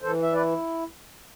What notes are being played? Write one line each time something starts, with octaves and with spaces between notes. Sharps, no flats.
E3 A4 C5
E5
E4 B4 D5